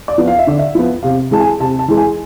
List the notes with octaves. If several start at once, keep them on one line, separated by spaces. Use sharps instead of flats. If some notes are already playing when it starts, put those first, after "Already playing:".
D5
F3 B3
F5
E5
D3 D5
E5
F3 B3
C3 F5
E3 G#3 A5
G#5
C3 A5
A5
E3 G#3
G#5